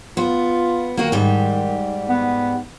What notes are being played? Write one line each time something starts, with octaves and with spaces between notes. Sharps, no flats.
B3 F4
D#3 A#3 F#4
G#2 G3
B3